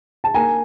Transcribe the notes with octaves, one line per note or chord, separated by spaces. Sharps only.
A5
A#3 G#5 A#5